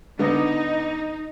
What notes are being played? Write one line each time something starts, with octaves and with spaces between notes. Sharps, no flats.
D3 B3 D#4